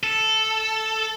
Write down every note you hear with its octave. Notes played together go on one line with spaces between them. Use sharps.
A4